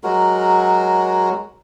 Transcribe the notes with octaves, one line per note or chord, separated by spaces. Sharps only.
F#3 G#3 F#4 A#4